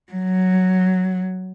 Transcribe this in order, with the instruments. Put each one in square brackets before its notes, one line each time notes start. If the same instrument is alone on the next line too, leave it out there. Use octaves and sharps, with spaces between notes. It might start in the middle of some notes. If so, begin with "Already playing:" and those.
[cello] F#3